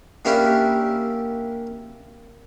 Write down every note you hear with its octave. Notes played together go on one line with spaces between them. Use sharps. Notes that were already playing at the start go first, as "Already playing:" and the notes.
A#3 C#4 D4 E4 G4